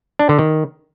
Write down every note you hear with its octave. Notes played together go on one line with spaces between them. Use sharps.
D4
D3
D#3